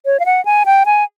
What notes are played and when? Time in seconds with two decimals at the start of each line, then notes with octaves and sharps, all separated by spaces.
0.06 C#5
0.20 F5
0.26 F#5
0.45 G#5
0.66 G5
0.86 G#5